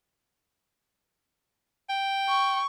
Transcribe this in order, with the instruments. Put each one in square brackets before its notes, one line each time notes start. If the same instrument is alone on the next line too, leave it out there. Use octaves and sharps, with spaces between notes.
[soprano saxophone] G5
[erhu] C#6